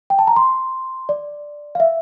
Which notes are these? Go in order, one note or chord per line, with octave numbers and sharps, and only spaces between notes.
G5
A5
A#5
C6
D5
F5
E5